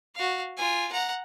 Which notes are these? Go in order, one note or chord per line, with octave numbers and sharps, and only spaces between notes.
F#4 F5
F4 G#5
F#5 A#5